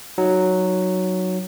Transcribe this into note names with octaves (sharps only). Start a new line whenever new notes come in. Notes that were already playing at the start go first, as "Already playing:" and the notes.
F#3 D#4